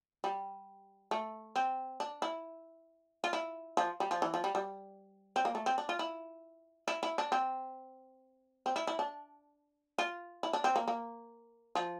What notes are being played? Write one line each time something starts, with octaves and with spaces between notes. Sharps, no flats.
G3
A3
C4
D4
E4
F4
E4
F3
G3
F3
E3
F3
G3
G3
C4
A#3
A3
C4
D4
F4
E4
E4
E4
D4
C4
C4
E4
E4
D4
F4
E4
D4
C4
A#3
A#3
F3